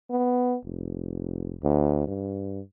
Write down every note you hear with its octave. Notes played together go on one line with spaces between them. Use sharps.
B3
F1
D2
G2